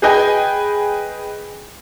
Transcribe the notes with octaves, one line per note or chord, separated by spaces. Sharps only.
G#4 B4 D#5 G5 G#5